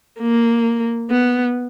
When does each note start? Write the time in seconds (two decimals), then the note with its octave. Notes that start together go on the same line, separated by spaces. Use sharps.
0.20 A#3
1.10 B3